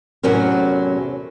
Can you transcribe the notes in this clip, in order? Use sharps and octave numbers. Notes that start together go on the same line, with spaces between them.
E2 A2 C3 F#3 C#4 A#4